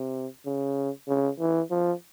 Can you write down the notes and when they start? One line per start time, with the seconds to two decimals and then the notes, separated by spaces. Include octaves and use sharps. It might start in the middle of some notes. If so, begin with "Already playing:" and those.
Already playing: C3
0.46 C#3
1.08 C#3
1.39 E3
1.71 F3